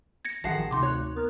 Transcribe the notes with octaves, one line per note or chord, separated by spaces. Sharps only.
G#6 A#6 C#7
A1 D#3 F3 G#4 F#5 A5 A#6 C7
D2 C3 D#4 C6 D6
G#1 C#5 F#6
B3 A#4